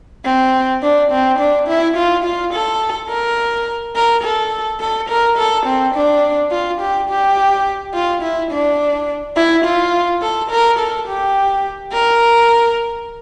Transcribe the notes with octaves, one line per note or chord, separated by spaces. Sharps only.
C4
D4
C4
D4
E4
F4
F4
A4
A#4
A#4
A4
A4
A#4
A4
C4
D4
F4
G4
G4
F4
E4
D4
E4
F4
A4
A#4
A4
G4
A#4